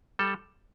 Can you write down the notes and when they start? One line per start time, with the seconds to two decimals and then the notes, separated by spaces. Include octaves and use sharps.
0.19 G3 A4